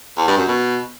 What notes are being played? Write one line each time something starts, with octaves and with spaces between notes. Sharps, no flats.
E2
G2
F#2
B2